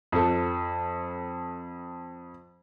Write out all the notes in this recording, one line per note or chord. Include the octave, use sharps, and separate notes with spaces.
F2 A4